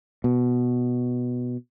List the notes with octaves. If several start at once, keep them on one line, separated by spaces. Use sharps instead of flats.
B2